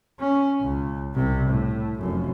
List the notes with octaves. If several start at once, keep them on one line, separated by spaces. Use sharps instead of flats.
C#4
C#2
C2 C3
A2
F1 F#2